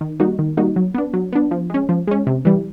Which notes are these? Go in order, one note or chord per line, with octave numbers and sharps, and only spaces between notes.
D#3
G3 A#3 D#4 F#4
D#3
G3 A#3 D#4 F#4
F#3
B3 D4
F#3
B3 D4
F3
G#3 C#4
F3
G#3 C#4
C3
E3 G3